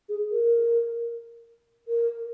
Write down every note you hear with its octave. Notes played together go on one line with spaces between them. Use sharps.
G#4
A#4
A#4